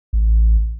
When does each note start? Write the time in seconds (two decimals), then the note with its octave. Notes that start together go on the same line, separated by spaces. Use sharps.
0.13 A1